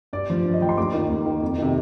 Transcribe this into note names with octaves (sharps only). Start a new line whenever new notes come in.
G2 D5
F3
G2
D#5
F3 G5
C6
D#2 D6
D#3
D#2
D#3
F2
C3 D#3